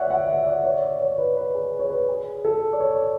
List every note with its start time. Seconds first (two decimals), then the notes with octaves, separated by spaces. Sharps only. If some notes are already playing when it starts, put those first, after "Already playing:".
Already playing: C#5 D5 E5 F#5
0.10 F#5
0.28 E5
0.47 D5
0.64 C#5
0.82 D5
1.01 C#5
1.18 B4
1.37 B4
1.54 G#4
1.79 C#5
1.90 B4
2.08 G#4
2.45 A4
2.73 D5
2.80 C#5